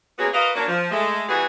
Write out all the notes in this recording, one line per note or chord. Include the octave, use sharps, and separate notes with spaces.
G#3 A#3 B3 C#4 F#4 G#4
F#4 A#4 B4 D#5 F5
F#3 A#3 D4
F3
G#3 A3
E3 G3 B3 F#4 G#4